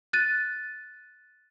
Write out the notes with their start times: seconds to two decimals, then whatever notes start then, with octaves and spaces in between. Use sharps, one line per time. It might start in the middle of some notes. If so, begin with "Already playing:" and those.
0.13 F#6 A6 D#7